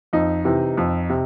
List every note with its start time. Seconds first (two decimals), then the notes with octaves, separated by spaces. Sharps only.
0.13 F2 D#4
0.45 C3 E3
0.77 F2
1.10 C3